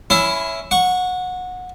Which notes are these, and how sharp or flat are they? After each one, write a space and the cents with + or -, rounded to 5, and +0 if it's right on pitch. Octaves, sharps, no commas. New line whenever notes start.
C#4 +5 E4 +0 B5 +45
F#5 -20 C#6 -5